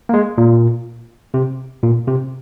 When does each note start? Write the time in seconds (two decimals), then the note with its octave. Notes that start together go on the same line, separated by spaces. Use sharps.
0.09 A#3
0.14 G#3
0.38 A#2
1.34 C3
1.83 A#2
2.07 C3